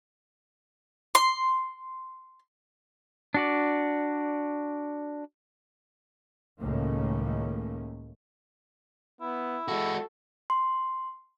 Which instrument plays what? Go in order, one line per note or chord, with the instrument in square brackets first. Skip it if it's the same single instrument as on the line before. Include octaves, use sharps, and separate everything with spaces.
[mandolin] C6
[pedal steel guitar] D4 F#4 D5
[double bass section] C#2 A2 D#3 A3 A#3 C#4
[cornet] B3 [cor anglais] E4
[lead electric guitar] G#3 F#4 [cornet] A4
[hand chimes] C6